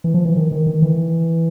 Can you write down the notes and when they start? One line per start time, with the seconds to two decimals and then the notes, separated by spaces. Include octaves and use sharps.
0.04 E3
0.14 F3
0.25 E3
0.36 D#3
0.52 D#3
0.67 D#3
0.82 E3